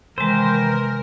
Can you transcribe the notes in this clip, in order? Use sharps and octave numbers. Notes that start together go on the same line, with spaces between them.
C3 D#3 E3 G#3 A#4 C5